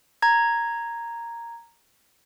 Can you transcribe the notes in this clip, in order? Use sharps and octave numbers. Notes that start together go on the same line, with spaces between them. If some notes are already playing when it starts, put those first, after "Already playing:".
A#5 G#6